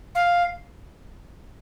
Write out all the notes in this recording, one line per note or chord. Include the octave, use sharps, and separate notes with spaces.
F5